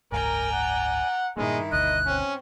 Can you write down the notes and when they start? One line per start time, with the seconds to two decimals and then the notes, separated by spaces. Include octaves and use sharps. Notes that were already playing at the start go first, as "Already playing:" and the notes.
0.12 F#1 C#2 G#2 A#4 D5 G5 G#5 A#5
0.52 F#5
1.36 G2 A#2 D#3 G#3 A#3 E4
1.72 G1 D2 B2 D#5 F#6
2.06 C4 C#4